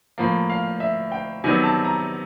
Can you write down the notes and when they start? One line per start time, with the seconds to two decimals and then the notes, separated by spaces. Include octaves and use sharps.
0.18 A2 F3 A#3
0.50 F5
0.80 E5
1.12 G5
1.44 C3 D#3 F#3 B3 G#5
1.64 A5
1.84 A#5